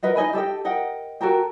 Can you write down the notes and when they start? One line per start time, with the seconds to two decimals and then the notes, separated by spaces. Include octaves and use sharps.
0.03 A#4 B4 D#5 F#5
0.16 D#4 D#5 G#5 B5
0.33 G4 A4 D#5 G5
0.65 A#4 D#5 F#5 G5
1.21 F#4 A4 A#4 G5